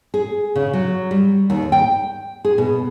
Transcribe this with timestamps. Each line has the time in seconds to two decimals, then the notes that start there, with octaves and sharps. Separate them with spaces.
0.14 G#4
0.56 C#3
0.73 F#3
1.11 G3
1.50 D#2
1.72 G5
2.45 G#4
2.58 B2